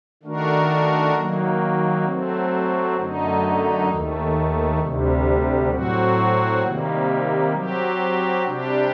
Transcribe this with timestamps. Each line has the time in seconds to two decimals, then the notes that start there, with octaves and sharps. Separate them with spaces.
0.23 D#3 A3 D4 F#4 A#4
1.14 D#3 F#3 A#3
2.06 F#3 A3 C4
2.96 F#2 D3 A3 D#4
3.88 D#2 D#3 A3
4.79 D2 C3 G3
5.72 A2 F#3 C4 F#4
6.63 C3 D#3 G3 A#3
7.53 F#3 C4 G4
8.45 C3 G3 D4 G4